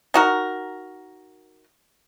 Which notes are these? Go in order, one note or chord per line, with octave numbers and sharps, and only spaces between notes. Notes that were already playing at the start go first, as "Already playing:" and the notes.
D#4 F#4 A#4